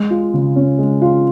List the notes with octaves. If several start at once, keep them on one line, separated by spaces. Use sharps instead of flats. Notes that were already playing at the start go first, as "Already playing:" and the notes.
Already playing: G#3
F4
C#3
C#4
G#3
F4